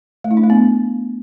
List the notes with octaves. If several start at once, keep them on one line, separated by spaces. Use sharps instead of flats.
A3
E4
D4
A3
B3